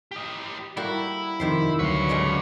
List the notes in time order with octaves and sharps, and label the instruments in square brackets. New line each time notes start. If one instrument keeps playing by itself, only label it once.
[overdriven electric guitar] G4 D#5
[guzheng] G3 A#3 F#4 [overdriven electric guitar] E4
[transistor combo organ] F2 B5 [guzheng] C3 D#3 C6
[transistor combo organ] D2 F#3 C#6 [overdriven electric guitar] B4 F5
[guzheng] C#3 G#3 D4